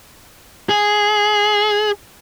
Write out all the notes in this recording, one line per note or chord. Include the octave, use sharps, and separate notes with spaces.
G#4